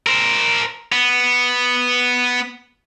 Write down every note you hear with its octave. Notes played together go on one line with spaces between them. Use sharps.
A#4 C5
B3